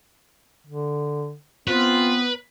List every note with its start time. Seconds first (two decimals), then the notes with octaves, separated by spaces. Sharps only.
0.67 D3
1.68 B3 C4 F4 B4